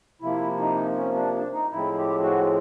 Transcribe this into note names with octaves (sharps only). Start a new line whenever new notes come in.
C3 F3 A#3 E4
D#4
C#4
D4
D4
D#4
A2 F3 G#3 C4 E4
G4
F#4